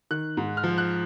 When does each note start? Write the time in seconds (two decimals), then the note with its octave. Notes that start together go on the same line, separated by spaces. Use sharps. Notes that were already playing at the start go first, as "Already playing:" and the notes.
0.11 D#3 F#6
0.37 G#2
0.57 F6
0.63 F3
0.78 F#6